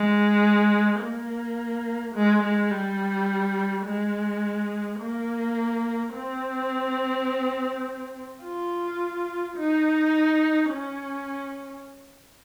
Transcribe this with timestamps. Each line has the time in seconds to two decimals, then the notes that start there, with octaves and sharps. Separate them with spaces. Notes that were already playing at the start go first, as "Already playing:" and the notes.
Already playing: G#3
1.00 A#3
2.15 G#3
2.43 G#3
2.71 G3
3.86 G#3
5.00 A#3
6.14 C4
8.43 F4
9.57 D#4
10.71 C#4